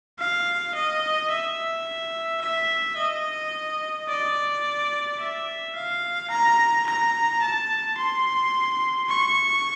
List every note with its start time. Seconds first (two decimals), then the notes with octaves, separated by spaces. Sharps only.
0.19 F5
0.75 D#5
1.30 E5
2.41 E5
2.97 D#5
4.08 D5
5.19 E5
5.75 F5
6.30 A#5
6.86 A#5
7.42 A5
7.97 C6
9.09 C#6